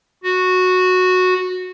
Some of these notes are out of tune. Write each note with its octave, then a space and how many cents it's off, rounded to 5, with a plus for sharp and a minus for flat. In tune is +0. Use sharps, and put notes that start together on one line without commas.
F#4 -10